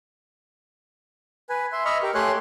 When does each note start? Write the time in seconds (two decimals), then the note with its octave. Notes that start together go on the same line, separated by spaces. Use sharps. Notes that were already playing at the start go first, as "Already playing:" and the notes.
1.49 B4 G#5
1.72 E5 C6
1.85 D#5 E5 B5 C#6 F6
2.03 G4 A#4
2.14 A3 G4 C#5 G#5 C6 F#6